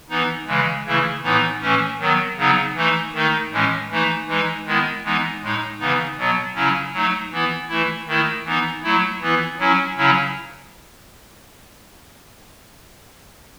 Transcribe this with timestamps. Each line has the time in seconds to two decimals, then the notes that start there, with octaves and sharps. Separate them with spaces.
0.10 E3 B3 D#4
0.47 C#3 E3 G#3
0.85 C#3 E3 A3 E4
1.23 A2 E3 B3 D#4
1.61 A2 E3 A3 C#4
1.99 D#3 F#3 B3
2.37 C#3 F#3 B3 D#4
2.75 E3 A3 D#4
3.14 D#3 A3 D#4
3.51 A2 E3 G#3 C#4
3.90 E3 A3 D#4
4.27 E3 G#3 D#4
4.66 D#3 G#3 B3 E4
5.04 E3 G#3 B3 D#4
5.41 A2 G#3 D#4
5.80 C#3 E3 B3 D#4
6.17 B2 F#3 B3
6.55 C#3 F#3 C#4 E4
6.93 F#3 A3 D#4
7.31 E3 B3 E4
7.69 E3 A3 E4
8.07 D#3 A3 E4
8.45 E3 B3 D#4
8.83 F#3 A3 E4
9.21 E3 B3 E4
9.59 F#3 C#4 E4
9.97 C#3 F#3 C#4 E4